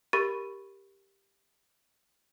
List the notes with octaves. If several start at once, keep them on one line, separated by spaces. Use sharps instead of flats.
G4 A#4 B5 C#6 A6 D#7